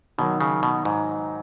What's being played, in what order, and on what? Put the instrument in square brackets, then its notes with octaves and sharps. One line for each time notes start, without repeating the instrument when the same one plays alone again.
[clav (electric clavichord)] B2 [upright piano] D#3 F#3 D#4
[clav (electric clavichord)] C#3
B2
G#2